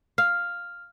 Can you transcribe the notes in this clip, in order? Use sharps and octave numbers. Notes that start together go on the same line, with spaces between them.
F5 F6